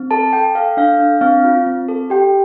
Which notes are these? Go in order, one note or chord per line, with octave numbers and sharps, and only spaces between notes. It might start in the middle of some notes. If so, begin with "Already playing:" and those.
Already playing: C4
A4 A5
A4 G5
A4 F5
D4 F5
D4
C4 F5
F4
C4
A4
G4 G5